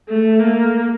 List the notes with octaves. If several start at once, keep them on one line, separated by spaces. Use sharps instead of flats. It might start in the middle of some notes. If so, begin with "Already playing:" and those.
A3
A#3